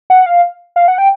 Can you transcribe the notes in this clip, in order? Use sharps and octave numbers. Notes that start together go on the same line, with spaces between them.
F#5
F5
F5
F#5
G5